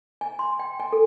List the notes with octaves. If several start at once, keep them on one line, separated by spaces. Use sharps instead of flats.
G#5
C6
G5
G#5
A4